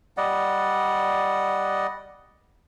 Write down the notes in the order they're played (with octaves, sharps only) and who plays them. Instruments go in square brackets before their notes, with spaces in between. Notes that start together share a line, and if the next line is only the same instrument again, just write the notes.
[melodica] G3 D5 D#5 F#5